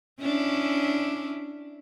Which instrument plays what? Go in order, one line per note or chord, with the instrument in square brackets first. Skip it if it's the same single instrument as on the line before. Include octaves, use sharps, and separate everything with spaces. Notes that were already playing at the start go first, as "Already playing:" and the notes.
[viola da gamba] C#4 D4 E4